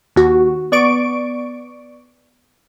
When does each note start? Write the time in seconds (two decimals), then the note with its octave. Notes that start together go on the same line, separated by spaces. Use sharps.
0.16 D#2 F#4
0.72 B3 D5 C#6 D7